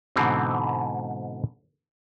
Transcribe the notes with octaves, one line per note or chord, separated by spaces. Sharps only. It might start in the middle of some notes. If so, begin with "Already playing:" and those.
G#2 B2 D3 E3 C4